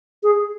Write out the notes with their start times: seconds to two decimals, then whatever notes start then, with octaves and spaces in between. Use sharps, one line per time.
0.23 G#4